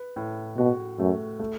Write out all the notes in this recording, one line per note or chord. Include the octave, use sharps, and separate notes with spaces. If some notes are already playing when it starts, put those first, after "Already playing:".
Already playing: B4
A2
B2 F#4
F#2 A3
A3